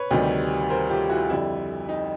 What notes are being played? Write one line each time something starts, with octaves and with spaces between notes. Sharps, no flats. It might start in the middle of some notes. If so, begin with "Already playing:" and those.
Already playing: B4 C#5
D2 C3 D#3 G3
A#4 C5
F4 G4
E4 F#4
F2 D3 G3 E4
D#4